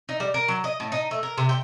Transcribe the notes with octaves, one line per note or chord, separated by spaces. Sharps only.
D#4
G3
A#4
F#3
D#5
A2
D#4
A3
A#4
C3
G5